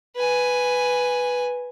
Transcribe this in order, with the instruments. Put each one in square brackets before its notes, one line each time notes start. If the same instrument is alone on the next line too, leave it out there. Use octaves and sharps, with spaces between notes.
[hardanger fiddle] B4 G#5